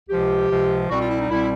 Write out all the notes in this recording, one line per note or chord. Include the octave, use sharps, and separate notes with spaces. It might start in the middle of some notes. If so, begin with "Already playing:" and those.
C#2 C3 F3 G4
C#2 C3 F3
C2 B2 G3 C4 F#4
F4
E4
D#4
C2 B2 G3 C4 E4